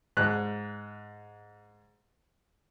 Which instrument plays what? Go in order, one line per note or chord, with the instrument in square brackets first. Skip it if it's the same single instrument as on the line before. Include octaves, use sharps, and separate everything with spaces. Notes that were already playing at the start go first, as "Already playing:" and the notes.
[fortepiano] G#2 F#6